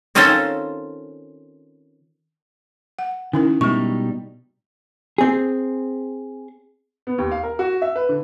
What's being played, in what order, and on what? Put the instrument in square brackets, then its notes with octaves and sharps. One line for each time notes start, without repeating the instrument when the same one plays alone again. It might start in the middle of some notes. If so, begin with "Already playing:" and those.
[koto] D#3 C4 C#4 F4 A4 C5
[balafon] F#5
[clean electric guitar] D#3 [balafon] C#4 E4 A#4
[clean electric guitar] B2 G3 D#4 [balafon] G#3 C#6
[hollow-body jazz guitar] C4 G#4
[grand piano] B3
D#2
F5
A#4
F#4
E5
B4
D3